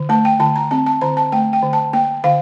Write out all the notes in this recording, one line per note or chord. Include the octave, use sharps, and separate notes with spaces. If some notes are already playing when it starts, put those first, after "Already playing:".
Already playing: D3
A3 A5
G5
D3 A5
A#5
C4 A5
A5
D3 A#5
A5
A3 G5
G5
D3
A5
A#3 G5
D3 F5